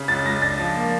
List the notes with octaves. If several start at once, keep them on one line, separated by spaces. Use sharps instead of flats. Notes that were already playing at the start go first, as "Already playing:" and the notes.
Already playing: C#3
C#2 A6
C#2 A#6
D4 A6
F3
A#3